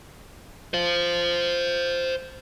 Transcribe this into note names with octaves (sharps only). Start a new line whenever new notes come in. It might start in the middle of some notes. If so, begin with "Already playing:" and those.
C5 F5